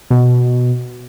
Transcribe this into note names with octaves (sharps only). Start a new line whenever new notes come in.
B2